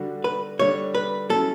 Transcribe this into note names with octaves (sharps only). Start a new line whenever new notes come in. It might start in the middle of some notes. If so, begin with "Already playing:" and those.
Already playing: D3 G3 D4 F#4
B4
D3 G3 D4 C#5
B4
F#3 C#4 E4 A4